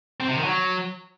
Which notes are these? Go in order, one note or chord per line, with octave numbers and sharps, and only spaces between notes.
C4
C3
D#3
F#3